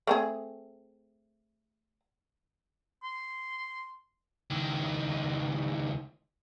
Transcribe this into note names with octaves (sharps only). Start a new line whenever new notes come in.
A3 C4 G#4
C6
C#2 D#3